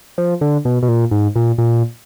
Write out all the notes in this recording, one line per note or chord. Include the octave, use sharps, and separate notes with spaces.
F3
D3
B2
B2
A#2
G#2
A#2
A#2